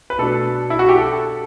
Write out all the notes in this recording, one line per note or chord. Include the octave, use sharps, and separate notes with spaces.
B4
B2 A3 D4 A4
E4
F#4
G4
A4